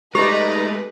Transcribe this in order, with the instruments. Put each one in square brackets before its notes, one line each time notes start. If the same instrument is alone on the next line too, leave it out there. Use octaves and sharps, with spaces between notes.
[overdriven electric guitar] G#3 A3 [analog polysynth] D#4 D5 A#5 [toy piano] G4 [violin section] B4